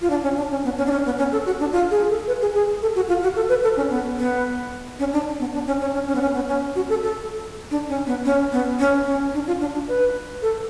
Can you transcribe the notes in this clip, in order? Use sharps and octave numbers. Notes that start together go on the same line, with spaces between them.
F4
D4
C#4
D4
C#4
B3
C#4
D4
C#4
B3
C#4
A4
F#4
D4
F4
G#4
A4
B4
G#4
G#4
A4
F#4
F4
F#4
A4
B4
A4
C#4
B3
B3
C#4
D4
B3
D4
C#4
C#4
C#4
C#4
B3
C#4
B3
C#4
F#4
A4
A4
D4
C#4
B3
C#4
B3
C#4
C#4
D4
F4
D4
D4
B4
A4